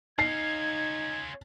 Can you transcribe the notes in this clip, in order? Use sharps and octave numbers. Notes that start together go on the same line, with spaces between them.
C#4 D#4 F4 G#6 C7